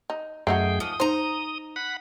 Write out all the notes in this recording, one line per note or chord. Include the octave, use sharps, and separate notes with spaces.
D#4
F#2 A3 D#4 F#4 G#4 G5
G#2 F3 D#6
D#4 C5 A#5
F#5 B5